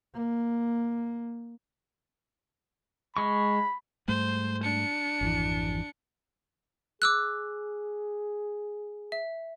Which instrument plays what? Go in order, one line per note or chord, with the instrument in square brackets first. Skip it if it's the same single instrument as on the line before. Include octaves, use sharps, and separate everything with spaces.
[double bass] A#3
[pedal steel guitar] G#3 C#6 [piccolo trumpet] B5
[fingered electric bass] G#2 G3 A3 [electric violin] C5
[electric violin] D4 C#7
[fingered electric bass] G#1 F2 E3
[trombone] G#4 [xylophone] D6 E6 F#6
[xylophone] E5